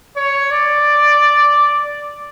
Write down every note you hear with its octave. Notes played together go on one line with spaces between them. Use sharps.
C#5
D5